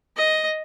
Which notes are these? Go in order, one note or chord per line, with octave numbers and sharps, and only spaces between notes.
D#5